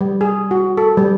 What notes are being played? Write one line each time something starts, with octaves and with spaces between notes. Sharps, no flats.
G3
G#4
F#4
A4
G3